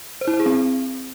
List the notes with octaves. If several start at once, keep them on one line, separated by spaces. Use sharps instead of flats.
C5
E4
C5
G#4
C4